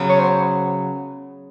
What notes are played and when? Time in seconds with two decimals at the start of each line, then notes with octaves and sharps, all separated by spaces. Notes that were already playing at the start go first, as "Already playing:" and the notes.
Already playing: C#3 F#3 B3
0.09 C#5
0.19 C5